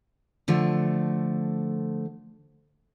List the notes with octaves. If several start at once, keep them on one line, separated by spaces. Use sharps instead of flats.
D3 F3 A3